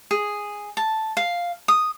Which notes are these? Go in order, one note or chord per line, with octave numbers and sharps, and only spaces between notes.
G#4
A5
F5
D#6